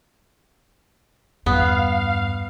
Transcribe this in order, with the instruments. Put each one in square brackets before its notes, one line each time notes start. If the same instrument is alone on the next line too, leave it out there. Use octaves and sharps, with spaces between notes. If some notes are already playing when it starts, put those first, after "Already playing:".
[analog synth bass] E2 [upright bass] G2 [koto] B3 [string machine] F5